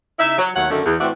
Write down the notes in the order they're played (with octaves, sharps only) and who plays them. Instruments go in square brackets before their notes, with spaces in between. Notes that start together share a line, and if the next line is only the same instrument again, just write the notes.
[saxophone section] C#3 D#4 E4 E5
F#3
D#2 F#3 A3 C#5 F#5
F#2 D3 D#3 A3
E2
A2 E3 A3 C4 F#4 D5